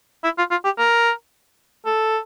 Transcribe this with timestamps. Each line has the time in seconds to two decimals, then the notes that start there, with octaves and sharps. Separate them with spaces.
0.24 E4
0.39 F4
0.51 F4
0.65 G4
0.78 A#4
1.86 A4